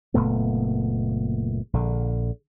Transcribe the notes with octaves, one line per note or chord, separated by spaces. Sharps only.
F#1 A#2 A3 B3
A#1 D3